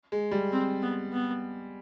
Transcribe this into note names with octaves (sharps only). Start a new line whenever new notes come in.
G#3
G3
C4
B3
B3